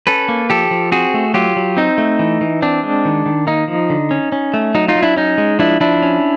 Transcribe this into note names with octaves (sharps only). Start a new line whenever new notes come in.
C#4 A4 B4
A#3
F3 G4 A4
F3
C4 F#4 G#4
A3
F#3 F4 G4
F#3
C4 D#4
A3
E3
E3
C4 D4
G#3
D#3
D#3
A#3 D#4
F3
D3
C#4
C#4
A3
F#3 D#4
D#4 F4
F#3
D4 E4
C#4 D#4
G#3
F3 D4 E4
F3 D4 E4
C#4